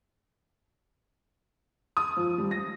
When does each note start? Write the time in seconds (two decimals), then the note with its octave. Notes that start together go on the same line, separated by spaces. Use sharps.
1.97 D#6
2.17 F3
2.38 G3
2.51 A#6